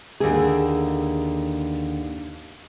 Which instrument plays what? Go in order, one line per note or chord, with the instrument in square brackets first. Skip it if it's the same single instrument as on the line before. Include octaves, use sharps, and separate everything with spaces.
[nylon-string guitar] D#2 D3 G#4